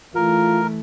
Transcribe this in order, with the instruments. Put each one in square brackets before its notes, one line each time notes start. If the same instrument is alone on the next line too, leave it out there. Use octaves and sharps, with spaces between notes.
[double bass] E3 A3 [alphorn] F4 [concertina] A#4